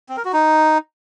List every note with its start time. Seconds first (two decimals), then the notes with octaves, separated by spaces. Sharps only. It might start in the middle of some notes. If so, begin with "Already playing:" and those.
0.09 C4
0.17 A#4
0.25 F#4
0.33 D#4